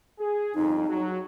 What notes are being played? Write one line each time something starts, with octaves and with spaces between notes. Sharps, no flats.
G#4
G1 F2 D#4
F#3